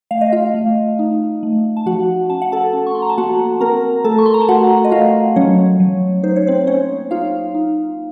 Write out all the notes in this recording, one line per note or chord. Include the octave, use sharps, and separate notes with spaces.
A3 F5
D#5
F4 F5
A3
D#4
A3
A5
F3 F#4 F#5
C#4 A5
F#5
A4 A5
C#4
C#6
C6
A#5
A5
A#3 F#4 F#5
C4 A#4 A#5
A3 A4 A5
C#6
C6
A#5
A5
A3 F#4 F#5
D#5
A3 F4 F5
F#3 C#4 C#5
F#3
D#4 C5
C#5
C4 C5
A#3 C#4 C#5
D#4 F4 F5
D#4